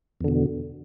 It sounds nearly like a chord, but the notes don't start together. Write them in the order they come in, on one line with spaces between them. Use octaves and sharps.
E2 D3 B2